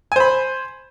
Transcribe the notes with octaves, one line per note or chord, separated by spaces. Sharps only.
C5 G#5 B5